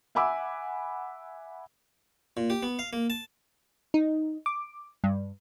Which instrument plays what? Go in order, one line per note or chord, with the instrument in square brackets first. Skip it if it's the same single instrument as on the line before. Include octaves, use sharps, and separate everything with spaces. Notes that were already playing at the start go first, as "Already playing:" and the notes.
[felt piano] E5 F#5 G#5 B5 D6 E6
[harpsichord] A#2
G4
B3
F5
A#3
A5
[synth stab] D#4
D6
G2